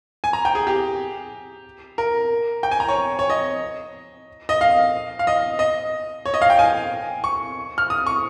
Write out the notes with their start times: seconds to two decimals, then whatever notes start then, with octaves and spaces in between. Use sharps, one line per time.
0.24 G#5
0.33 A#5
0.45 G5
0.55 G#4
0.67 G4
1.98 A#4
2.63 G5
2.71 G#5
2.80 A#5
2.88 C#5
3.19 C#5
3.30 D#5
4.49 D#5
4.61 F5
5.19 F5
5.27 D#5
5.59 D#5
6.26 C#5
6.34 D#5
6.42 F5
6.50 G5
6.59 G#5
7.24 C#6
7.78 F6
7.90 D#6
8.06 C#6